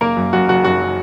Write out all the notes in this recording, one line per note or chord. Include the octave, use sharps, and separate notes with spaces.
F#1 A#3 A#4
F#2
F#2 F#4
F#1 F#4
F#2 F#4
F#3